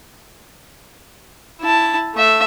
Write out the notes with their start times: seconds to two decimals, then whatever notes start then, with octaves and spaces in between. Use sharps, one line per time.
1.61 E4 A5
2.15 A3 E5